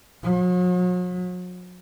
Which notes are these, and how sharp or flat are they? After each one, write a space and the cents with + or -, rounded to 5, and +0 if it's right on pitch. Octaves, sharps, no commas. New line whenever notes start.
F#3 -45